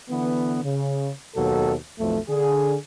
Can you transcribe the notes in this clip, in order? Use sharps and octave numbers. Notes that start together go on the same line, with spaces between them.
D3 E3 B3
C#3
D#2 B2 F#3 A4
B1 F2 A3
D3 G#4